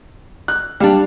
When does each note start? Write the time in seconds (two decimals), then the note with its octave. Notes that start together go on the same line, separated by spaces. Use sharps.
0.48 F#6
0.80 G3 D4 F5